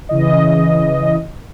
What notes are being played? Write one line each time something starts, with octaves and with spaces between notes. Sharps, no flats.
C#3 E3 D#5